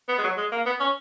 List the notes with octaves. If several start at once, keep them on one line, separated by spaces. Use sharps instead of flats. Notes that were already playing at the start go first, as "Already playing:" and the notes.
B3
G#3
F#3
G#3
A#3
B3
C#4